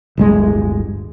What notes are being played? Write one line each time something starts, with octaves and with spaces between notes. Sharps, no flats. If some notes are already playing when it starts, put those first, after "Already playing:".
D1 G1 G#3